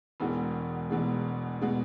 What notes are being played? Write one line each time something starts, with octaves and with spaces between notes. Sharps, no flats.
E1 E2 B2 G#3
E1 E2 B2 G#3
B2 G#3